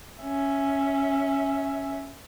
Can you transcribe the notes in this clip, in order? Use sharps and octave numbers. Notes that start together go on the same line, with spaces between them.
C#4 E5